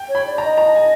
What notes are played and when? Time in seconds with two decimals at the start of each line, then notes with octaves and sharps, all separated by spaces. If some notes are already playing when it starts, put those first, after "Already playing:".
Already playing: G5
0.09 C#5
0.15 B5
0.26 D5
0.38 A#5
0.44 D#5
0.58 A#5
0.66 A5
0.75 G#5